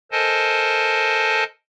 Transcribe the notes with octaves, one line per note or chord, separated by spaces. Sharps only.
A4 A#4 C5 D#5 G#5 A5